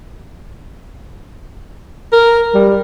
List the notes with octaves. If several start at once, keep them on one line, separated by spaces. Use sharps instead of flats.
A#4
G3